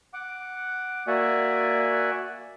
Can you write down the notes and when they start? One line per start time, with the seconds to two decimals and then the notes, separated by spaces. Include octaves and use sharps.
0.14 F#5 D6
1.07 A#3 F#4 D5 E5 F#5 G#5